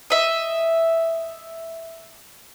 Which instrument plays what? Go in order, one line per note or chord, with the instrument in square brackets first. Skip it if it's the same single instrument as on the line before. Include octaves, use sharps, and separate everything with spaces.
[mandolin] D#5 E5